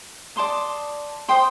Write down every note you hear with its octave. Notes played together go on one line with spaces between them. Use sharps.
D5 A5 C6 D#6
C5 G5 C6 D#6